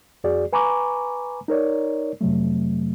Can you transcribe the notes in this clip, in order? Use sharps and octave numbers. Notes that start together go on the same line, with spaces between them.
F2 F#4 G#4 D5
B4 G#5 A#5 B5 C#6 D6
D#4 A#4 C#5 D5
F2 C3 F#3 A3